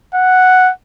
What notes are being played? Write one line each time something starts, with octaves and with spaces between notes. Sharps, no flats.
F#5